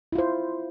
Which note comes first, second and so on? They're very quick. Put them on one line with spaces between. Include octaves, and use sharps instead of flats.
E4 F4 C5